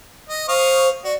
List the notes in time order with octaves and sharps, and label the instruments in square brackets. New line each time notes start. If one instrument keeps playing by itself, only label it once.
[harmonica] D#5
[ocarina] C5 [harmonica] F5 C#6 D#6
[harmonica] F#4 [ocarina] D5